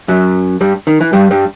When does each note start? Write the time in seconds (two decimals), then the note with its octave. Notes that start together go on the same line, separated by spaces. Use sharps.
0.08 F#2 F#3
0.61 G2 G3
0.87 D#3
1.01 E3
1.13 G2 G3
1.31 G2 G3